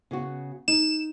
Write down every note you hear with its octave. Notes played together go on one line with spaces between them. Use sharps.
C#3 B3 F#4
D#4 E7